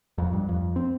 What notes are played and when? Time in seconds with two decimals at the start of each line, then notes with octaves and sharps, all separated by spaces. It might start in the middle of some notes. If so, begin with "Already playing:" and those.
0.18 F2
0.33 G2
0.49 F2
0.76 C4